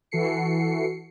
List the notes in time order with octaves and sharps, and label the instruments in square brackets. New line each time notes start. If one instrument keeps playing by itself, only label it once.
[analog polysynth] E3 F#4 A4 C7 C#7